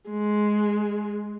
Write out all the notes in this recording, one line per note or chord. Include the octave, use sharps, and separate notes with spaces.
G#3